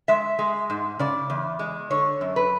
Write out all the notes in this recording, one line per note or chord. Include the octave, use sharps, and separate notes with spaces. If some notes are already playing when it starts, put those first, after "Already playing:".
G#3 E5
G#3
G#2
C#3 D5
E2
G#3
D3 C#5
F#2
B4